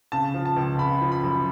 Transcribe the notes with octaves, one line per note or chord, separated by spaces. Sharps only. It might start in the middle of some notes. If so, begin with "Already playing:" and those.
C#3 A5
F3
A5
C#2
C#3 B5
F3
B5
F#2